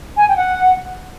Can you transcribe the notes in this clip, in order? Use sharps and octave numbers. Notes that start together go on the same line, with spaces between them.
G#5
G5
F#5